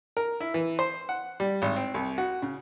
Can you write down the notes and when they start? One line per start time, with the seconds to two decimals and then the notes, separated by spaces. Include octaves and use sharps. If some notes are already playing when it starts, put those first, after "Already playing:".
0.17 A#4
0.40 E4
0.54 E3
0.79 C5
1.09 F#5
1.40 G3
1.62 G#1
1.76 C4
1.94 C2
2.18 F#4
2.42 C#3